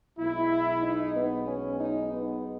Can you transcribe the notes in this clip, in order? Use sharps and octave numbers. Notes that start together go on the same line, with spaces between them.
B1 B2 G#3 E4
D#4
B3
C#4
D#4
B3